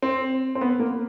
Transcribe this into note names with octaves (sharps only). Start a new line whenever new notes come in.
C4
C4
B3
A#3